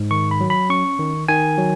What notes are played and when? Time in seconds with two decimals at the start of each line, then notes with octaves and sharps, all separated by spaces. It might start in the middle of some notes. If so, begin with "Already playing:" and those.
Already playing: G#2
0.11 D#3 C#6
0.31 B5
0.41 F#3
0.50 B5
0.70 C#4 C#6
0.99 D#3
1.28 D#3 G#5
1.58 F#3